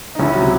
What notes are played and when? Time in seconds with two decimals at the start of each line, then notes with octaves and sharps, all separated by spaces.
0.15 D#4
0.19 C#2 C#4 E4
0.35 C3 F#3